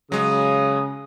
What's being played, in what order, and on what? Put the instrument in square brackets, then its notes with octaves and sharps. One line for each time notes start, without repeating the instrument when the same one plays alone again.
[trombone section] C#3 [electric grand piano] F#3 G#3 [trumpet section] D#6